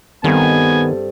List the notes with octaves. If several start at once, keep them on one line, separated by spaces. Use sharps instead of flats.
G2 D#3 B3 C4 A4 G#5